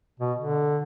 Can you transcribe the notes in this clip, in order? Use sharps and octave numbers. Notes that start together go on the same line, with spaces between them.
B2
D3